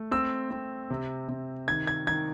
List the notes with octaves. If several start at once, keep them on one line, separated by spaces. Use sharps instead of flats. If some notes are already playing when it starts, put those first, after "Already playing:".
Already playing: A3
C4 E6
C4
C3
C3
D#3 G#6
G#6
D#3 G#6